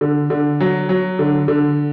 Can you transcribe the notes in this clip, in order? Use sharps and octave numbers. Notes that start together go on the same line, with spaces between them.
D3
D3
F#3
F#3
D3
D3